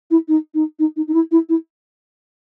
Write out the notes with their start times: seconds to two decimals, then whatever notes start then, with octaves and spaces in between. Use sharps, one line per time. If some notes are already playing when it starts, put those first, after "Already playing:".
0.10 E4
0.28 D#4
0.54 D#4
0.79 D#4
0.96 D#4
1.08 D#4
1.14 E4
1.31 E4
1.49 E4